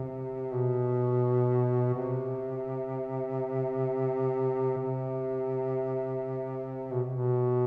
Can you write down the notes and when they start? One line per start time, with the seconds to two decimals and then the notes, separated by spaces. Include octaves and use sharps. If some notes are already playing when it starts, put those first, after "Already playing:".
Already playing: C3
0.52 B2
1.94 C3
4.78 C3
6.92 B2
7.10 B2